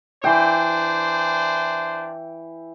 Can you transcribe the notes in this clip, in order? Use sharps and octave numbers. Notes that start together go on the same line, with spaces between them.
E3 D4 C5 G5